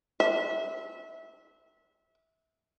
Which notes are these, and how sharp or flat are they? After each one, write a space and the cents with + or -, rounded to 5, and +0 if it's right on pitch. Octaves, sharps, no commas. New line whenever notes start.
E5 -25